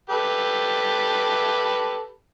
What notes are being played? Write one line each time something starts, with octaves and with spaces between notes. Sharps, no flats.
G4 A4 B4